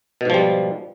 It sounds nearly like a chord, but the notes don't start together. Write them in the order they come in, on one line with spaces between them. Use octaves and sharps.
B2 G#2 F3 G3